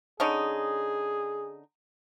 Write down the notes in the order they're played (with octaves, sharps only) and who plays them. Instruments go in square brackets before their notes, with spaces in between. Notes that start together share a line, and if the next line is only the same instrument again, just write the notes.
[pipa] D3 C#4 D#4 [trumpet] G#4